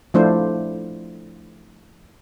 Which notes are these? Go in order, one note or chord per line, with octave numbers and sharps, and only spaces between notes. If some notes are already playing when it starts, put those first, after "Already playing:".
F3 A3 D4 E4 F4 C5